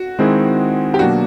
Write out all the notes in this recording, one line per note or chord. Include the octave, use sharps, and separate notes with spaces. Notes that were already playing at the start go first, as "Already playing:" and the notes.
Already playing: F#4
D#3 G#3 C4 E4 G#4
G4
B2 F#3 A#3 D4 F#4